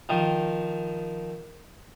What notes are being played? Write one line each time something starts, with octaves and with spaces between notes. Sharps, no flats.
D#3 F3